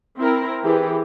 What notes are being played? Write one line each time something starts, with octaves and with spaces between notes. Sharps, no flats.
C4 E4 A#4
E3 G4 G#4